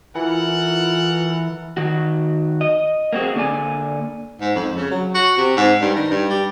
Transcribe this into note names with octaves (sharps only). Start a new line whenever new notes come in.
E3 F4 A4 A#4 F#5
D#3 F#4
D#5
A#3 C4 F#4 G#4
D3 A#3 D5 G#5
G#2
F2
C#3
F#3
F#4
C3
G#2
G2
D#3
G2
G3